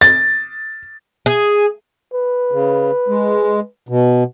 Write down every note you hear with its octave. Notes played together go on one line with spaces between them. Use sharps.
A6
G#4
B4
C#3
G#3
B2